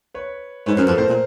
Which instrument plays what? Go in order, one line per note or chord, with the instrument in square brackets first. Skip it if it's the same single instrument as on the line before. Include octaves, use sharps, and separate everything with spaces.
[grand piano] B4 C#5
[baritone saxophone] G#2 [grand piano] B4 C#5
[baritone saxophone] F#2 [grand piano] A#4 C5
[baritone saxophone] F2 [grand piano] A4 B4
[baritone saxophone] A2 [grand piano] A#4 C5
[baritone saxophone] A#2